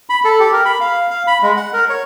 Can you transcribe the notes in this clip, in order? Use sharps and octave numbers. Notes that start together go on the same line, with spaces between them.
B5
A4
G4
A#4
B5
F5
F5
B5
G#3
F#5
A#4
C#5